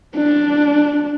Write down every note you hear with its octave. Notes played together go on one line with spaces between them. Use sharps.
D4